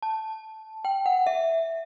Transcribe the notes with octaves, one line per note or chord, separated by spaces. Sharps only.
A5
G5
F#5
E5